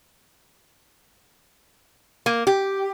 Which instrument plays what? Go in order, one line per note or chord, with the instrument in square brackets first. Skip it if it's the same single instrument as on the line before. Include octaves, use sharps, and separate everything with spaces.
[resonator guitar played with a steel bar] A#3
G4